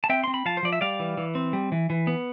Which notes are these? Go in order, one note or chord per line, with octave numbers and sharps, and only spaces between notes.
A5
C4 E5 G5
C4 C6
B5
F3 F5 A5
C5
F3 D5
E5
G3 D5 F5
E3
E3
C4
G3
E3
E3
B3